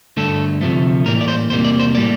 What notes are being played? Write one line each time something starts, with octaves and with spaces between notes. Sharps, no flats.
G2 D3 A3 A4
D2 C3 F3 A3
A2 E3 G3 A#3 A#4
D5
C5
E2 C3 G3 A#3 C5
D5
C5
A2 G3 A#3 D5